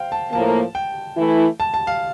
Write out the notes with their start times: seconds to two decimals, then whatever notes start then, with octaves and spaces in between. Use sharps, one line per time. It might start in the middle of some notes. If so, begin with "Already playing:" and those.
Already playing: C5 F5 G5
0.12 A5
0.33 A2 F3 A#3 A5
0.75 G5
1.17 E3 A3 E4
1.60 A5
1.74 A5
1.87 F5